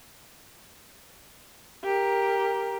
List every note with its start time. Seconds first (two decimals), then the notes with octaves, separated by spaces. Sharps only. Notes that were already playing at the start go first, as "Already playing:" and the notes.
1.84 G4 A#4